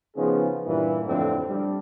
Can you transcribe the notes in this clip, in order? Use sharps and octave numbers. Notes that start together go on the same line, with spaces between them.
C#3 F3 B3 C#4 D#4 G#4
G2 A#2 E3
F2 A2 D3 F3 C4 A4
G3 D4